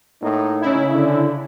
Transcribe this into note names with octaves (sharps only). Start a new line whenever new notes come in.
A2 A#3 D#4
C#3 E4
D3